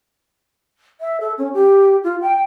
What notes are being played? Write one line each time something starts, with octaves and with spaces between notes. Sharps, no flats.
E5
A4
C#4
G4
F4
G5